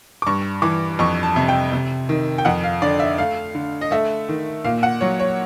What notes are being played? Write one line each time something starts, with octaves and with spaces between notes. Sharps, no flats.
D6
G2 C#6
E3 D6
F2 C#6
A5
C3
G5
C3
D#3
G5
F2 F#5
F5
D3 D5
E5
A3 F5
D3
D#5
A3 E5
D#3
A#2 F5
F#5
F#3 C#5
C#5